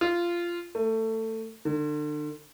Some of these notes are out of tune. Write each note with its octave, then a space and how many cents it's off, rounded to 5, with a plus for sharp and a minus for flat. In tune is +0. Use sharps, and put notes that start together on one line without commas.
F4 -15
A3 +20
D3 +40